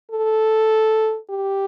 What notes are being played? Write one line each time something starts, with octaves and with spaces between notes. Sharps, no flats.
A4
G4